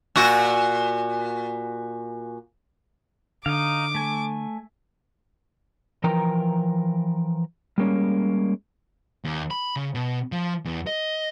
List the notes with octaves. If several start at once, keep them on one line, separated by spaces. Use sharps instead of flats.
A#2 F#4
D3 D#4 F5 D6
A3 G#5
E3 F3 A#4 G5 A#5
G3 G#3 A#3 C#4
D#2
B5
C#3
B2
F3
E2
D#5